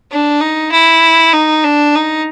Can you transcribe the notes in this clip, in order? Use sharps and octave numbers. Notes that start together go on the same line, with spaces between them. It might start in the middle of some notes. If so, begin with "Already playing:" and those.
D4
D#4
E4
D#4
D4
D#4